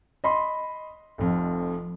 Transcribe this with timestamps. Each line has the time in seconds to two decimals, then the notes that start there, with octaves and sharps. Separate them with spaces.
0.24 D#5 B5 C6
1.18 F1 F2